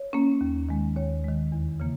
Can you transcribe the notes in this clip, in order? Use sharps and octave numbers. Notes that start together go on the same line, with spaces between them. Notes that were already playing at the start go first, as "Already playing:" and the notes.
Already playing: C#5
A#3 C#4
D#2
D#3 G#3
D#2 C#5
D#3 G#3
E2
C#3 E3 A#3